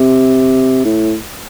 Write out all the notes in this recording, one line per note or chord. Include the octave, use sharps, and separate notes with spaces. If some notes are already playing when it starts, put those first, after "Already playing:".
Already playing: C3
A2